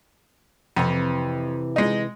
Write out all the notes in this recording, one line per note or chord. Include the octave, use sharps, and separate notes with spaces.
F2 C3 E3
G#3 D#4